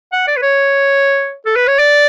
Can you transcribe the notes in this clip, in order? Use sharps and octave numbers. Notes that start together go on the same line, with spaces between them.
F#5
D5
B4
C#5
A4
B4
C#5
D5